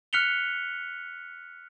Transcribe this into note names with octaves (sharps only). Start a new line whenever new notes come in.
F6 F#6 B6 C#7 F7 G7